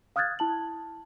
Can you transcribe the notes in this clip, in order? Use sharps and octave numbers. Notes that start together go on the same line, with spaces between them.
F5 D#6 F6 F#6 G#6 A6
E4 A5 F#7